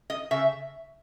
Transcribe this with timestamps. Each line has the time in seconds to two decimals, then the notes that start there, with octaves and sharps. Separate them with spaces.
0.10 D#5
0.31 C#3 E5